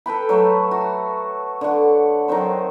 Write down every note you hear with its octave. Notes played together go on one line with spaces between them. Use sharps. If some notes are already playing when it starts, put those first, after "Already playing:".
A4 B4 G5 B5
F#3 A3
F#4
D3 F#5
D#3 F#3 C4 C5